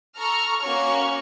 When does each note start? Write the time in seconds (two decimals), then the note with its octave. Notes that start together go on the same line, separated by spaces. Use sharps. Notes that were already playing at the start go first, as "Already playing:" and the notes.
0.18 A4 A#5 C#6 F6
0.61 A#3 C#4 F#4 C#5 C#6 F6